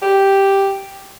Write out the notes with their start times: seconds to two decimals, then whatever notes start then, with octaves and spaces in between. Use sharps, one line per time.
0.02 G4